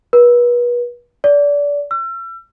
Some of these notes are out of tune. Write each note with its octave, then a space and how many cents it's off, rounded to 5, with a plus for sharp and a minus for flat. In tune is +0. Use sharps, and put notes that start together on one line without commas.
B4 -35
D5 -25
E6 +40